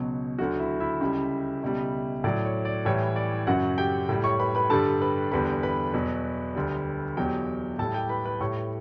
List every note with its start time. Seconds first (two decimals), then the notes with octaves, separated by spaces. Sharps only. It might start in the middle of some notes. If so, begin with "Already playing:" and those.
Already playing: C#2 B2 F#3
0.39 D2 D3 F#3 F#4 F#5
0.59 E4 E5
0.80 E4 E5
1.01 C#2 C#3 G3
1.63 C#2 B2 G3
2.24 A2 F#3 D5
2.45 C#5
2.65 D5
2.85 A2 E3 G3 C#5
3.16 D5
3.47 F#2 C#3 F#3 F#4 F#5
3.78 G4 G5
4.09 A2 G3
4.24 C#5 C#6
4.39 B4 B5
4.55 B4 B5
4.70 G2 D3 G3 A4 A5
5.01 B4 B5
5.32 E2 D3 G3 B4 B5
5.63 B4 B5
5.94 E2 B2 F#3
6.55 D2 D3 G3
7.17 E2 B2 F#3 G4 G5
7.79 A2 G3 A4 A5
7.94 G4 G5
8.09 B4 B5
8.25 B4 B5
8.41 A2 G3 C#5 C#6